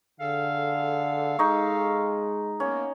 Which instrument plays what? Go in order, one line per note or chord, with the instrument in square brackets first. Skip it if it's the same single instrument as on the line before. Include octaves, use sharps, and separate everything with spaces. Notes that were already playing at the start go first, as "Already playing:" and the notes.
[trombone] D3 [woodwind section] G#4 A4 F5
[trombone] G#3 [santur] D#4 C#6
[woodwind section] A#3 B3 [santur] C#4